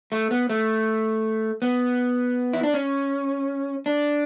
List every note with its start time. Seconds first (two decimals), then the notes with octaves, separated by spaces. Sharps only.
0.12 A3
0.31 B3
0.50 A3
1.62 B3
2.53 E4
2.63 D4
2.74 C#4
3.86 D4